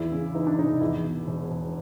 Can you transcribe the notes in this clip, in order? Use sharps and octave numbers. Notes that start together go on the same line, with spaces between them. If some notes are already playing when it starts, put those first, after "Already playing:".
Already playing: E2 E4
C#3
E3 D#4
D4
F1 D#4
E2 E4
B2
E1
E1